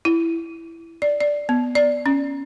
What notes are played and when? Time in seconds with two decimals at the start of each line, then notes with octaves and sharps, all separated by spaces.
0.05 E4
1.02 D5
1.21 D5
1.49 B3
1.75 D5
2.06 C#4